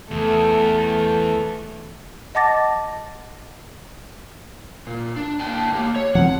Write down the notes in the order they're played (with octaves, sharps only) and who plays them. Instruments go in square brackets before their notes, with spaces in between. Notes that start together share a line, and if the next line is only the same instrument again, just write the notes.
[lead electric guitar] E2 [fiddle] A3
[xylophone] D#5 F#5 A5 D6 A6 A#6
[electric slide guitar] A#2
D4
A#3 G5 A5
A#3 G4
C#5
[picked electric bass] F3 C4 [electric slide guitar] F#5